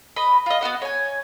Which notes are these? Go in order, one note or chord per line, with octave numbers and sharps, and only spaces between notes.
B4 D#5 B5
F4 D#5
B3 F4 F#4 D#5
C#5 G#5